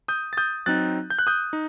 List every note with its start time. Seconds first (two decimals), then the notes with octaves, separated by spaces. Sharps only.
0.08 D#6 G6
0.33 A6
0.37 D#6 G6
0.66 F#3 C4 D#4 F#6 A6
1.10 G6
1.19 F#6
1.27 D#6 G6
1.53 D#4